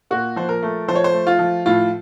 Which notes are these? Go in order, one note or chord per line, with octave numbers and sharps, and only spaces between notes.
A#2 F#4
F3 C5
A#4
A3
F3 C5
C#5
C5
A3
F4
F3
A2 F4